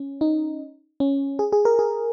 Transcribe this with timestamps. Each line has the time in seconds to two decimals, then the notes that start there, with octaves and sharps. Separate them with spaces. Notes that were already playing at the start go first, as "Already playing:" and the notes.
Already playing: C#4
0.21 D#4
1.00 C#4
1.39 G#4
1.52 G#4
1.65 A#4
1.79 G#4